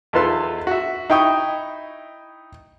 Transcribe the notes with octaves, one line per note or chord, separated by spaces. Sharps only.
E2 D#4 F4 A4 B4 C6
F#4 E5
D#4 E4 G5 C#6 D#6